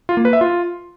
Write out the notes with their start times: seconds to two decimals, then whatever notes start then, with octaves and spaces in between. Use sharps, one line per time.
0.09 F4
0.17 A#3
0.25 B4
0.33 E5
0.41 F4